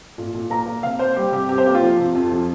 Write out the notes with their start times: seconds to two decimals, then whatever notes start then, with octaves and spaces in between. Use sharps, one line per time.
0.18 A#2
0.34 A#2
0.50 A#3 A#5
0.67 A#3
0.83 C3 F5
0.99 A#3 C5
1.16 G3 G4
1.32 C3 G4
1.49 C3 G4
1.58 C5
1.66 A#3 G4
1.75 F4
1.83 F3
1.99 C3
2.15 F2
2.32 F3